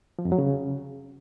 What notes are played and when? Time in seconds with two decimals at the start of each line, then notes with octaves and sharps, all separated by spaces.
0.19 F3
0.25 F2
0.32 F#3
0.38 C#3